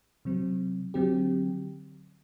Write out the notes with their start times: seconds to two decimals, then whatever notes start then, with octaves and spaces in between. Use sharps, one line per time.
0.25 C3 F#3 C4
0.94 D3 F#3 C4 G4